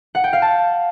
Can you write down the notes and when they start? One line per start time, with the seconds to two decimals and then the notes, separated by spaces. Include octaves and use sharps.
0.15 F#5
0.24 G5
0.33 F5
0.42 A5